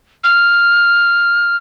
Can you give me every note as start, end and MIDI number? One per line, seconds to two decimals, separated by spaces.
0.24 1.56 89